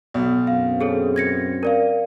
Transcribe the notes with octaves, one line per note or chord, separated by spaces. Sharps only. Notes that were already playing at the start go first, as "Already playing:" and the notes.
B1
F#2 C4 F5
G#4 A4 C#5
G#6 A#6 C#7
A#4 D5 F5